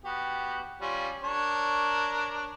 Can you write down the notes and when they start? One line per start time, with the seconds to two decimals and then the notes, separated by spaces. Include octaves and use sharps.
0.04 B3 F#4 G4
0.81 G3 C#4 F4
1.24 D4 A#4 C#5